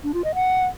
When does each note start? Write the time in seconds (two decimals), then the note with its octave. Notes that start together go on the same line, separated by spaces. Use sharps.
0.04 D4
0.14 F4
0.24 D#5
0.35 F#5